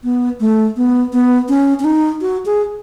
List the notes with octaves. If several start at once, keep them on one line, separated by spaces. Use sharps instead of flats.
B3
A3
B3
B3
C#4
C#4
D#4
F#4
G#4